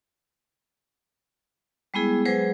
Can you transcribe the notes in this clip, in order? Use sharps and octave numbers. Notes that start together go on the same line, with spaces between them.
G3 G#3 B3 E4 G#4
F#3 G#3 G#4 B4 C5